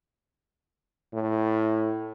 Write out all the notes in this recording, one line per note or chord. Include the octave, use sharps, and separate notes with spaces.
A2